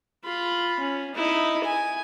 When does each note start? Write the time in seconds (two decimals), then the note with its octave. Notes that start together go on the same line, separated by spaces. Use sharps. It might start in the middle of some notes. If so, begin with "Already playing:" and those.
0.24 F4 B5
0.79 C#4
1.14 D#4 E4
1.64 G#5